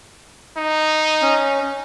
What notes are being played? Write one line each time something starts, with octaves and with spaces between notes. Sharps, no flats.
D#4
C#4